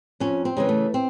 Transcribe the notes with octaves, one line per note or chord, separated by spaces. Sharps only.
F2 C#4
C4
C#3 E3 G#3
A3
C4